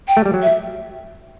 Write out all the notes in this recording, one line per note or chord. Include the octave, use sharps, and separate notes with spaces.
G5
A3
G3
F#3
E5